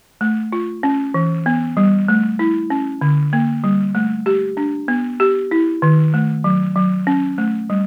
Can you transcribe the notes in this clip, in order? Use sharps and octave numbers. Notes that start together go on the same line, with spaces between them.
A3
F4
C#4
E3
B3
G3
A3
E4
C#4
D3
A#3
G3
A3
G4
D4
B3
G4
E4
D#3
A3
F#3
F#3
C#4
A3
G3